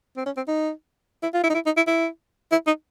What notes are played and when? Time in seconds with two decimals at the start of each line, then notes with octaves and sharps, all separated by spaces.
0.17 C4
0.26 C#4
0.37 C4
0.48 D#4
1.23 E4
1.34 F4
1.43 E4
1.50 D#4
1.54 E4
1.66 D#4
1.77 E4
1.87 E4
2.52 E4
2.67 D#4